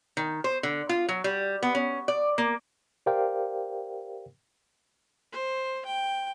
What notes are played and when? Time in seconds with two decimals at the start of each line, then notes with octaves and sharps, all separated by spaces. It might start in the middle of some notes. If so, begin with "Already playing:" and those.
0.17 D#3
0.44 C5
0.63 D3
0.89 F4
1.09 F#3
1.24 G3
1.63 B3
1.75 C#4
2.08 D5
2.38 A#3
3.06 G4 A#4 C5 D5 F5 G5
5.32 C5
5.85 G5